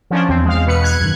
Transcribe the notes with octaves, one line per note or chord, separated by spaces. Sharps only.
F3 C#4 D4
E2 C4
G#3 F5
B2 B4 C#7
F#6 G#6
F#2 D#3